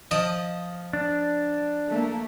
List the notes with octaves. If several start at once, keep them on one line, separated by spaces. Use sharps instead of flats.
F3 D#5
D4
A3 A#3